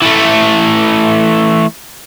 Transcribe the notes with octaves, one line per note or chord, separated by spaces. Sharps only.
E3 A3